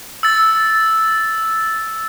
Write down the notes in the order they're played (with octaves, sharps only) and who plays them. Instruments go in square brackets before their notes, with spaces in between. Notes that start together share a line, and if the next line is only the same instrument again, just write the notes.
[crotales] E6 A6